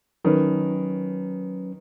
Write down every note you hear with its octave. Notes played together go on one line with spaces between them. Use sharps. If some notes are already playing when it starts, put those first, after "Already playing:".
D#3 F#3 C#4 B4